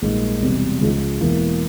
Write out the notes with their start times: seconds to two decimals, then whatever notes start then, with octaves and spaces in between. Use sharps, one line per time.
0.02 A#1 G#2 G3 A#3
0.41 E1 E2 C3 G3
0.81 C#2 C#3 F3 G#3
1.20 E1 E2 E3 A#3 E4